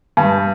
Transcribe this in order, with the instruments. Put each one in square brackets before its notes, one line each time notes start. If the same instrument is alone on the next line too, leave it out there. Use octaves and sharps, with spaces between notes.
[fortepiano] G2